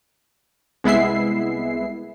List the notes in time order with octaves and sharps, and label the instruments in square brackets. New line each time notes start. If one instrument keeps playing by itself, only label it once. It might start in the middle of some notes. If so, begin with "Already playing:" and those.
[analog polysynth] C2 G#3 B3 E4 E5 C7